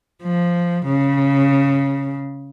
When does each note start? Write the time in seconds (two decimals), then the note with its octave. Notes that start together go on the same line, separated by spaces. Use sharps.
0.23 F3
0.86 C#3